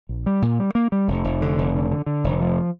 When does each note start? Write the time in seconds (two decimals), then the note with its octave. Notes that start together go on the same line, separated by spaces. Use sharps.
0.09 A#1
0.26 G3
0.42 A#2
0.60 G3
0.75 A#3
0.92 G3
1.08 F1
1.24 F1
1.42 D3
1.58 F1
1.75 D3
1.91 D3
2.06 D3
2.24 F1
2.40 F3